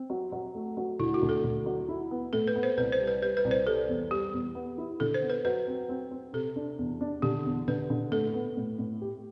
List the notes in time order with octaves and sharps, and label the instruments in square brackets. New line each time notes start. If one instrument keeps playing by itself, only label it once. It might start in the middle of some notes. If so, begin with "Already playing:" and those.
Already playing: [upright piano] C4
F#3
F#3
A3
F#3
[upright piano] D2 [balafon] E4
[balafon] F#4
[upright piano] D2
[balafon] A4
[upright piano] D2
F#3
E4
B3
[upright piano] A2 [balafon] A4
[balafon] B4
[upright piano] B3
[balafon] C5
[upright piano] C2 [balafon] B4
[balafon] C5
[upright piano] G3
[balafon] B4
[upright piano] G3 [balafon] B4
[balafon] B4
[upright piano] C2
[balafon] C5
[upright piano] G3 [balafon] A4
[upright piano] E2
[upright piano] G3 [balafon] G4
[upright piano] E2
B3
E4
[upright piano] D3 [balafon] A4
[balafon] C5
[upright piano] B3
[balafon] B4
[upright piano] F#3 [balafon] B4
[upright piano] C4
C4
C4
[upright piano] C3 [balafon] A4
[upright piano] D4
E2
D4
[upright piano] D3 [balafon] G4
[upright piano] E2
[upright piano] D3 [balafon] B4
[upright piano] D3
[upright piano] A2 [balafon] A4
[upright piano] B3
A2
A2
G4